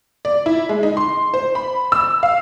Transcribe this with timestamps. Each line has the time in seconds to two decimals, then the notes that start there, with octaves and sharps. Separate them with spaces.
0.25 D5
0.46 E4
0.69 G#3
0.83 D#4
0.97 C6
1.34 C5
1.55 B5
1.92 E6
2.23 F5